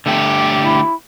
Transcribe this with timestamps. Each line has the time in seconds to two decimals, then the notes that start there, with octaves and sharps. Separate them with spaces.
0.06 D3 A3 G4
0.62 E4